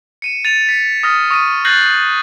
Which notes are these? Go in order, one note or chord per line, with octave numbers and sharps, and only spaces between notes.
C#7 D#7 E7
A6 D#7 F7
A6 B6 C#7
D#6 F6 A#6
C#6 D#6 A#6 C#7 D#7
F#6 G6 A6 A#6 C7 F#7